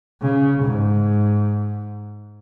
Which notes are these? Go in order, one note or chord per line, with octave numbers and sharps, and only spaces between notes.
C#3
G#2